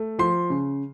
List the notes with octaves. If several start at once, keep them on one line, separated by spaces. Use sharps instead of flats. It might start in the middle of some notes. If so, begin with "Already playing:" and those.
Already playing: A3
F3 C6
C#3